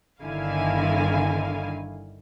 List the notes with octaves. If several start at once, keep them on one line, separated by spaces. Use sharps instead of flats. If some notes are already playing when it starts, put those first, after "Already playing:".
G1 D3 D#3 E4 F5 G#5